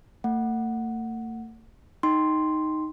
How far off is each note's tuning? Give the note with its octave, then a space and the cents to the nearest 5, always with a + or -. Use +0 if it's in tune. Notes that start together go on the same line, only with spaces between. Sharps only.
A3 +45 F#5 +0
D#4 +0 G5 +0 C6 +0